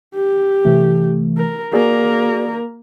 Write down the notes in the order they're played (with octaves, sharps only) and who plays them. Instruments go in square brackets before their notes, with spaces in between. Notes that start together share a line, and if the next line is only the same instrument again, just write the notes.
[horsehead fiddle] G4
[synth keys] C3 E3 A3
[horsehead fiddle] A#4
[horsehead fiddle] A#3 A#4 [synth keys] F#4 G#4 D5